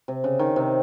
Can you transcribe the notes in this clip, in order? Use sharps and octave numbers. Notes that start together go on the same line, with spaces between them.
C3
C#3
D#3
C3